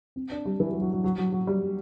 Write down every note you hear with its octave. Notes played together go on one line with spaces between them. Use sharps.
C4
D4
G3
E3
F#3
F#3
F#3
F#3
F#3
F#3
G3